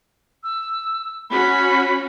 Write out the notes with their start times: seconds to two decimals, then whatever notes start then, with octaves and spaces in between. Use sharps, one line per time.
0.43 E6
1.30 C#4 F#4 B5